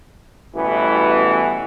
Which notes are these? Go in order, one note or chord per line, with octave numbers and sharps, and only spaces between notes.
A1 B2 E3 G3 B3 F#4